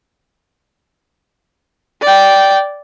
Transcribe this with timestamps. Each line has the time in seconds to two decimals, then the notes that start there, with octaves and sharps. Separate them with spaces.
2.02 D5 G5